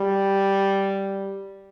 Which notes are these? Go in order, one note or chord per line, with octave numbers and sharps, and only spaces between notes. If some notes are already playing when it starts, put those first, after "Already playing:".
Already playing: G3